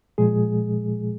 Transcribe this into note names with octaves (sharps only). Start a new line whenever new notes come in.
A#2 F3 G#3 G#4